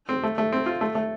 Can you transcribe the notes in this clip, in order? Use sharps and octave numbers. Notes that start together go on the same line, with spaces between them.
C4
A3
A3
C4
F4
A3
A3